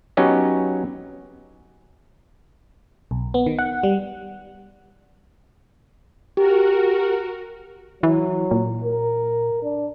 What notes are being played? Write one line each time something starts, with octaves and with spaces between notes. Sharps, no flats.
F#3 B3 C#4 D#4 G4
B1
B3
D#3
F#5
G3
F#4 G4 A#4
E3 F#3
A#2
A#4
D4